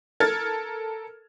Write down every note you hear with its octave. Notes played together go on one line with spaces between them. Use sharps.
A4 A#4 F6 G#6 A6